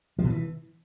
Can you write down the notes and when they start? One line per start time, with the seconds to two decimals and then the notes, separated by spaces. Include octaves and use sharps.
0.19 F3
0.24 B2
0.30 E3